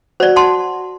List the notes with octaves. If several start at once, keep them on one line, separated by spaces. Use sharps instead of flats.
F#4 C5 D5
F#5 A5 C6